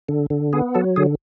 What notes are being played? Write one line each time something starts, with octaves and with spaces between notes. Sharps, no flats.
D3
D3
B3 G#4
F#3 A4
D3 G#4